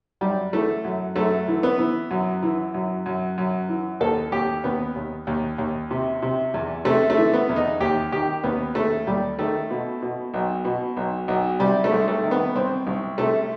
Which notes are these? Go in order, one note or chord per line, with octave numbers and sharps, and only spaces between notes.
F#2 G3
E3 A3
F#2
F#2 A3
E3
B3
E3
F#2
E3
F#2
F#2
F#2
E3
D#2 A4
D#2 G4
D#2 B3
D#2
D#2
D#2
C3
C3
E2
C3 A3
A3
E3
B3
E2
D#4
D#2 G4
D#3 G4
D#2 B3
D#2 A3
D#2 G3
D#3 A3
B2
B2
B1
B2
B1
B1
C3 G3
A3
C2
A3
D#3
B3
C2 C4
C2
C3 A3